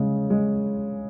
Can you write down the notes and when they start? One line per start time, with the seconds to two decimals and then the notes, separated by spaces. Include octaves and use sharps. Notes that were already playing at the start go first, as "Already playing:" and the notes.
Already playing: C#3 G#3
0.30 G#3